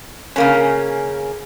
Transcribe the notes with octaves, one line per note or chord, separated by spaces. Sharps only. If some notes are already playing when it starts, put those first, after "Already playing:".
C#3 A#3 C#4